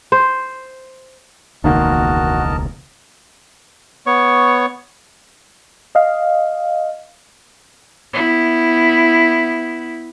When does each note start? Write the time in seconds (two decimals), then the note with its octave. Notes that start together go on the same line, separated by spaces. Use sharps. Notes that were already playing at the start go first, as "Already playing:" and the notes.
0.12 C5
1.64 E1 C#2 D#3 A#3 F#4 A#4 D#5 A5
4.06 B3 C#5 C#6
5.95 D#5 F5
8.13 B3 E4